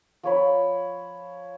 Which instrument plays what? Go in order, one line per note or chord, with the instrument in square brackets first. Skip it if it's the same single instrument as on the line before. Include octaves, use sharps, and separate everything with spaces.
[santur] F3 C#5 B5